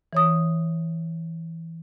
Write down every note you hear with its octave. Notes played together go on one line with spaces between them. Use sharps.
E3 C#5 D#6